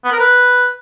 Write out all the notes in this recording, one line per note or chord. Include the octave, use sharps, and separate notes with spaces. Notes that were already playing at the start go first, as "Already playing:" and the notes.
B3
A#4
B4